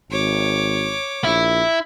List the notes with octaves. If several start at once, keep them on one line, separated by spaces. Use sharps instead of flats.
G#1 C#5 D6
A#1 E4